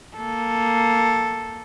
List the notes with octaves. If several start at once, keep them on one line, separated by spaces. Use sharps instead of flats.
A#3 A4